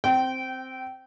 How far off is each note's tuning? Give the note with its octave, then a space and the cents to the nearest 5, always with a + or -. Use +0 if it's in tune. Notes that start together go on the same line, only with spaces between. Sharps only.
C4 +0 G5 -25